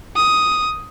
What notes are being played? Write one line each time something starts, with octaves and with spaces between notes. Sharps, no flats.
D#6